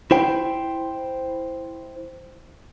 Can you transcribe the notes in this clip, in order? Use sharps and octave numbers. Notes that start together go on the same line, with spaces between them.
E4 C5 G5